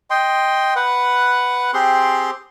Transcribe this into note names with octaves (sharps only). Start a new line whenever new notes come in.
D#5 G5 C6
B4 F#5
C4 G4 G#4 C6